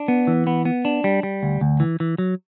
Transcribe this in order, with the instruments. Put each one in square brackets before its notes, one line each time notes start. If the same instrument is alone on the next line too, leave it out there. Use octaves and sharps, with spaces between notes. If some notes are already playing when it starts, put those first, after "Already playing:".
Already playing: [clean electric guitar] D4
B3
E3
B3
B3
D4
G3
G3
D2
D2
E3
E3
F#3